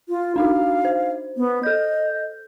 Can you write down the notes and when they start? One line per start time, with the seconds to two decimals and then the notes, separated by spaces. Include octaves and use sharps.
0.09 F4
0.36 D4 D#4 F#4 F5
0.85 C5
1.37 B3
1.63 A4 D#5 G6